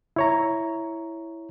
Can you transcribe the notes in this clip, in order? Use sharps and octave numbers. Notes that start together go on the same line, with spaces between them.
E4 C#5 A#5